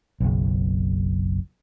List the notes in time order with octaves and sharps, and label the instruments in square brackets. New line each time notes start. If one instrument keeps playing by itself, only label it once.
[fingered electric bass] F#1 B1